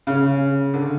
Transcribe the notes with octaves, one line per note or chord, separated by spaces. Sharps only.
C#3
D3